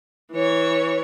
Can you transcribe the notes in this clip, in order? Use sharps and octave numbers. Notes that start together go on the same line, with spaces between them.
E3 C#5